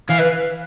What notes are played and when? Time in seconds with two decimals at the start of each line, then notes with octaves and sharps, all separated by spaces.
0.10 E3 F5
0.19 B4